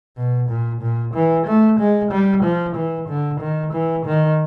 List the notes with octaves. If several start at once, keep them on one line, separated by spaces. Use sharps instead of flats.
B2
A#2
A#2
E3
A3
G#3
G3
F3
E3
D3
D#3
E3
D#3